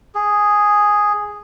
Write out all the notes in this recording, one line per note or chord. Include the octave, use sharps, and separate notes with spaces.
G#4